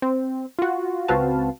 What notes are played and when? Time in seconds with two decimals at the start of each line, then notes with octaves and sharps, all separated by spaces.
0.02 C4
0.59 F4 F#4
1.08 C#2 C4 F#4 B4 F5 A5